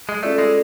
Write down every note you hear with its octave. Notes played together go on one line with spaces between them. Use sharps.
G#3
A3 C#4 F4 A4 D5
G#3